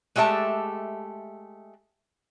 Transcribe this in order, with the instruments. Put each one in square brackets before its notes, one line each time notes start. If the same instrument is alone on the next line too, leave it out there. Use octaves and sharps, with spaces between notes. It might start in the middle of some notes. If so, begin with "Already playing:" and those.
[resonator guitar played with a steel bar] G#3 A3 G4 E5 A5